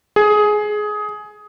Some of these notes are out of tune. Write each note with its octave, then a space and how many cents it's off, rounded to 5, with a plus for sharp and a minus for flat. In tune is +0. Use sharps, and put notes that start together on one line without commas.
G#4 +15